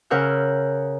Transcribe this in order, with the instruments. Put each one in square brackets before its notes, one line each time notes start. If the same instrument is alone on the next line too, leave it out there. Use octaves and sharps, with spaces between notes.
[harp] C#3 C#4 A#4 F#5 E6 G6